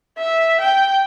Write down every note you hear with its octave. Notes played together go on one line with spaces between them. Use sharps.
E5
G5